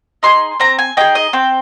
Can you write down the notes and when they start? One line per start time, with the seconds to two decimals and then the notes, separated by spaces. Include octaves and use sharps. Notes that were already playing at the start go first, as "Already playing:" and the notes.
0.23 D#4 G#4 C6
0.60 C4 A#5
0.79 G#5
0.97 D#4 G#4 G5
1.15 D#5
1.33 C4 G5